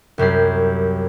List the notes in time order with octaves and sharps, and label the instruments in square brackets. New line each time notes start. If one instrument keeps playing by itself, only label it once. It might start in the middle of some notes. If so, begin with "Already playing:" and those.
[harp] C2 F#2 G4 C7